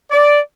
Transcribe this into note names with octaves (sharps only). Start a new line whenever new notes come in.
D5